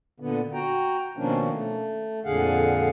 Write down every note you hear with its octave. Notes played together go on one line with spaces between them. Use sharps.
A#2 D3 B3
F#4 G5 A#5
B2 D#3 F3 A#3 C#4 D4
A3
F2 A#2 D3 G#4 F5 F#5